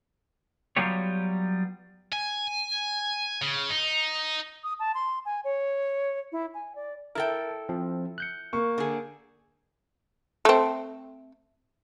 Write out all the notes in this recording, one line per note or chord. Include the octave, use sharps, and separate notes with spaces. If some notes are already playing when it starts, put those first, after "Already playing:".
F#3 G3 B3 F4 G4 C#5
G#5
C#3
D#4
D#6
A5
C6
G#5
C#5
E4
G#5
D5
E4 A4 A#4 G5
F3 C4
F#6 G6 C#7
A#3 C#6
D3 G#4
A3 C4